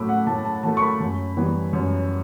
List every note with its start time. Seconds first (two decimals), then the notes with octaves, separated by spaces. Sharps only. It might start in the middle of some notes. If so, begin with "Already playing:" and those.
Already playing: A2 F#3 A3 B5 D6 E6
0.09 F#5
0.26 A2 A5
0.45 A5
0.63 F#3 A3 A5
0.77 C#6
0.81 B5
1.00 F#2
1.36 E3 G3 B3
1.73 F#2